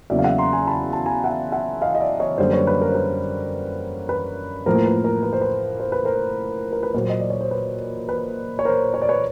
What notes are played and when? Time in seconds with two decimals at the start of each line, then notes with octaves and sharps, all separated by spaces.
0.10 E2 C#3 F#3 A#3 D5 E5
0.19 F5
0.24 E5 F#5
0.38 A#5 C6
0.53 G#5 A#5
0.67 A5 B5
0.93 A5
1.06 G#5 A#5
1.24 E5 F#5
1.52 E5 F#5
1.82 D#5 F5
1.95 D#5
2.01 D5 E5
2.20 C#5 D#5
2.38 F#2 D3 G3 A#3 C5 D5
2.53 B4 C#5
2.67 B4
2.81 A#4
2.89 C5
2.95 B4
4.09 B4
4.66 A2 F3 A#3 A#4 C5
4.86 B4
5.04 A#4
5.23 B4
5.33 C5
5.41 B4
5.80 C5
5.92 B4
6.05 A#4 C5
6.73 A#4
6.83 B4
6.94 A#2 F#3 A#3 A#4 C5
7.09 D#5
7.20 D5
7.30 C#5
7.41 C5
7.51 B4
8.09 B4
8.59 C#5
8.65 A#4 C5
8.94 C#5
9.02 D5
9.09 B4 C#5